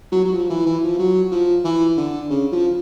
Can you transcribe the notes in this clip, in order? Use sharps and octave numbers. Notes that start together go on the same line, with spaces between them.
F#3
F#3
F3
E3
E3
F3
F#3
F3
E3
D3
C#3
F3